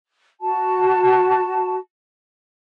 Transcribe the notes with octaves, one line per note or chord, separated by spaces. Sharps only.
F#4 A5